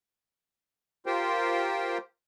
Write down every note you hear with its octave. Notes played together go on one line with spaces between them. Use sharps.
F4 G4 A#4 C5 G5